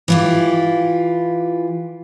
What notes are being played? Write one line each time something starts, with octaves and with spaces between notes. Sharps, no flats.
E3 F4 G4